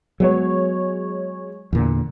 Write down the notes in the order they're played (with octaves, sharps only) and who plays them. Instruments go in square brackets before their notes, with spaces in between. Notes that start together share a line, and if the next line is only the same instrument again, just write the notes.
[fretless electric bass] F#3 B3 [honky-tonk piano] G#3 C#5
[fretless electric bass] E2 A#2 D3